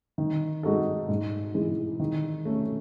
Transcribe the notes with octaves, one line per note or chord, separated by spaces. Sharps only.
D#3
G#3 D#4 F#4 A4
G#2
E3 G#3
D#3
A3 C#4